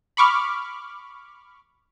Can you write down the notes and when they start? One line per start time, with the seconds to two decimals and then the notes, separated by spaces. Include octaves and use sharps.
0.17 B5 C#6 D6 F6